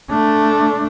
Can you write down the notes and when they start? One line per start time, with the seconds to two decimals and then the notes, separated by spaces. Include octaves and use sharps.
0.11 A3 D4